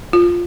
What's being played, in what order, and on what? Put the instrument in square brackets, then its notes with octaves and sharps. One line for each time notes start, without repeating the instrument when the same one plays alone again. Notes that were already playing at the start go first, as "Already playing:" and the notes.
[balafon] F4